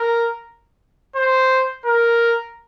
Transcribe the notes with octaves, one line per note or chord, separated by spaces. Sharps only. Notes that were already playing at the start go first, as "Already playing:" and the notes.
Already playing: A#4
C5
A#4